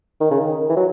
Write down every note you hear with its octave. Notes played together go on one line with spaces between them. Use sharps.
D#3
C#3
D#3
E3
F#3